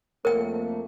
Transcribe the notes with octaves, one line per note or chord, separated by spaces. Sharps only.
F2 A3 A#3 A#4 G5